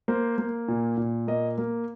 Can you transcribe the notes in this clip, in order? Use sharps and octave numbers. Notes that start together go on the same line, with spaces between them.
A#3 C5
A#3
A#2
A#2
A#3 D#5
A#3